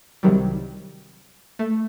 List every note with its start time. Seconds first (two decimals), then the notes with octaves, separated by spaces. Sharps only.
0.23 C2 C3 D#3 F#3 G3
1.59 A3